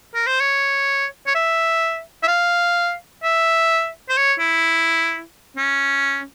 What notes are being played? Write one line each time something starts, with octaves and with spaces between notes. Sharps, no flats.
A#4
C5
C#5
C#5
E5
E5
F5
E5
C5
C#5
E4
C#4